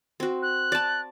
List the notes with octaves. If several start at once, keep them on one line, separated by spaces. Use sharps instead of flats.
C4 F#4
F#6
D5 A5